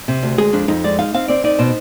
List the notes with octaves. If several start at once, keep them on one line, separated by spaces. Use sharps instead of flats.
C3
D2
G#3 G#4
F2 D4
F2 D#4
G#3 D5
D#4 F5
C4 F5
C4 D5
D#4 D5
B2 C5